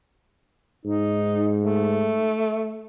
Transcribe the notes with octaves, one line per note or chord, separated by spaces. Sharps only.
G#2 D#4
A3